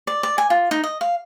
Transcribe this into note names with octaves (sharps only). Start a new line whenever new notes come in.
D5
D5
G#5
F4
D#4
D#5
F5